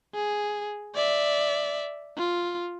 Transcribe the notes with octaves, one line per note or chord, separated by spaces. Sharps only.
G#4
D5 E5
F4